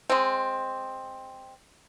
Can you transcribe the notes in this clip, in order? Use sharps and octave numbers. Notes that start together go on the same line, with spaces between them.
G#3 C4